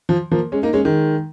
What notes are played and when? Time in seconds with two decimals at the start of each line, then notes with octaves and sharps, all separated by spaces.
0.09 F3
0.31 F3 A#3
0.52 G#3 C#4
0.63 A#3 D#4
0.73 G#3 C#4
0.85 D#3 G#3